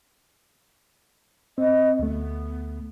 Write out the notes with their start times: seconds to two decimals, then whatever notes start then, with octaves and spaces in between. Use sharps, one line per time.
1.58 C4 D#5
1.99 D2 A3 B3